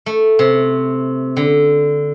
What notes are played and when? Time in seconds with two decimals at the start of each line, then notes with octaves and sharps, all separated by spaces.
0.06 A3
0.39 C3
1.37 D3